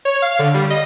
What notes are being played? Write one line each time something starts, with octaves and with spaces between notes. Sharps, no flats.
C#5
F5
D3
G3
D#5